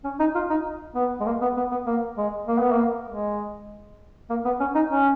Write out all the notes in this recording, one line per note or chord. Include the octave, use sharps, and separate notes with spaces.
C#4
D#4
F4
D#4
B3
G#3
A#3
B3
B3
B3
A#3
G#3
A#3
B3
A#3
G#3
A#3
B3
C#4
D#4
C#4